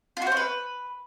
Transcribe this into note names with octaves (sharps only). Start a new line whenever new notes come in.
F4
F#4
C5
C#4
B4